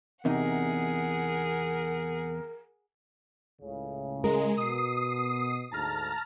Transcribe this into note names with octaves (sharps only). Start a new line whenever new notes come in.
E2 C3 D#4 G#4 A#4 F#5
C#2 A2 C#3
G#3 A#4
B2 D#6 C7
D2 G#2 A5 A#5 F6